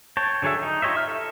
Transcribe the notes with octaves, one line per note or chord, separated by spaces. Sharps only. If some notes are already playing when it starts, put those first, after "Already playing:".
C#5 G5 A5
D3 F#3 G#4 A4 E5
D#4
F4 G4 C#5 D#5 E5
E5 F6
A4